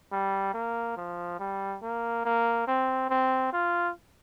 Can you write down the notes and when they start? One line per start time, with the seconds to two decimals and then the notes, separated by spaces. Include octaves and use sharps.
0.12 G3
0.54 A#3
0.97 F3
1.39 G3
1.82 A#3
2.25 A#3
2.68 C4
3.10 C4
3.53 F4